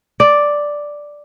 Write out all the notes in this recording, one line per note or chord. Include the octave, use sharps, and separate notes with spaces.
D5